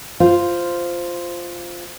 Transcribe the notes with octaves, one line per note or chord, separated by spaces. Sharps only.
F4 C5